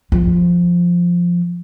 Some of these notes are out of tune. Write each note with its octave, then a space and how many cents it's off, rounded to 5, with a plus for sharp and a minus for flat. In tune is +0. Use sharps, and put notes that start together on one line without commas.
F3 +0 F4 +0